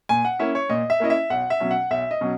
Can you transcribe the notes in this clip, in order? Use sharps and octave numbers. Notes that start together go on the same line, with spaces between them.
A#2 G#5
F#5
A#3 C#4 E4 E5
C#5
A#2 D#5
E5
A#3 C#4 E4 D#5
E5
B1 F#5
E5
B2 F#3 C#4
F#5
B1 E5
D#5
B2 F#3 C#4